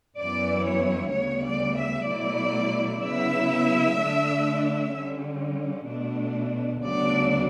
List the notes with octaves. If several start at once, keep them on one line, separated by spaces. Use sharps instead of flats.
F#2 E3 B3 E4 D5
C#5
D2 C#3 G3 B3 C#5
D5
E5
B2 F#3 A3 E4 D5
C#3 F#3 B3 E4 E5
D3 A3 D4
D3 G3 C#4
B2 A3 D4
D2 C#3 F#3 B3 D4 D5